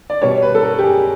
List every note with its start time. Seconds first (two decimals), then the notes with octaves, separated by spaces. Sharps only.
0.10 D5
0.22 B2 G3 A#3 C#5
0.42 B4
0.55 A4
0.63 A#4
0.78 G4
0.83 G#4